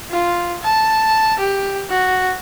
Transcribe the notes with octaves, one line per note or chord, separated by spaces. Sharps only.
F4
A5
G4
F#4